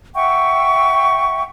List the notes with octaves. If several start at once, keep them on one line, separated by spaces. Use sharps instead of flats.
E5 F#5 G5 C#6